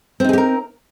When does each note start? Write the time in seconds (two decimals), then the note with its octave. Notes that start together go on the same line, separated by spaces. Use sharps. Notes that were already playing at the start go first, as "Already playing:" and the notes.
0.20 C4
0.24 D#4
0.29 G#4
0.33 G4
0.38 A#4